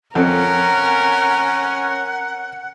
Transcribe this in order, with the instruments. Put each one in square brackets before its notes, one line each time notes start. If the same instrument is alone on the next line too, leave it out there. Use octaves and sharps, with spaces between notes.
[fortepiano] F2 C4 A4 [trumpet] C#4 [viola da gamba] A#4 [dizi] F#5